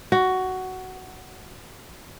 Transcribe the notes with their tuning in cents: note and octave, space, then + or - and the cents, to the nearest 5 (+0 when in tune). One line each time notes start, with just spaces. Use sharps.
F#4 +10